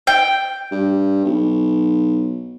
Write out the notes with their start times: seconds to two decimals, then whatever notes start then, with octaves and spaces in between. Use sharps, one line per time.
0.07 G5
0.71 G2
1.25 B1